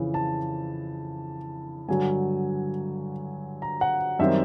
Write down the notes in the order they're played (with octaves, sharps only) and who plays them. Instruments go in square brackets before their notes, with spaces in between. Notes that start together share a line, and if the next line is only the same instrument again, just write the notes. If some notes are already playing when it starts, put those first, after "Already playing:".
Already playing: [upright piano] F2 C#3 E3
A5
G2 D3 F#3 G#5
A#5
F#5
F#2 D#3 G3 C4 E5